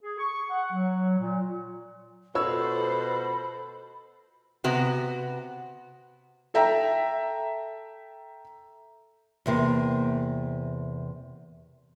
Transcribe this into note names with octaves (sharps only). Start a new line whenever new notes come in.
G#4
C#6
F#5
F#3
A#2
B2 F4 A4 C5 C#5 B5 E6
C3 B3 F#4
A4 E5 G5 A#5
E2 C3 A#3